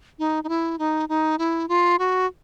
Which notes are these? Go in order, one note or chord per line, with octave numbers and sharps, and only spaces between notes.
D#4
D#4
E4
D#4
D#4
E4
F4
F#4